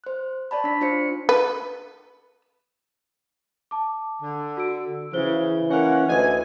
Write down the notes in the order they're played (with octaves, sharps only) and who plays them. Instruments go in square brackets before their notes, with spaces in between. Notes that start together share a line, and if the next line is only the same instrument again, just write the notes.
[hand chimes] C5 F#6
C#5 D5 A5 B5
D4 B6
D4 F4 C5 C#5 C#7
[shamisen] B4
[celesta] A5 D6
[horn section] D3
[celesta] F#4 E6 D7
[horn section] C#3 [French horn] E3 [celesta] C5 G7
[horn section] A#3 A#4 F#5 [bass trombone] C#4
[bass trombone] D2 [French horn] B4 [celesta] D#5 [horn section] G#5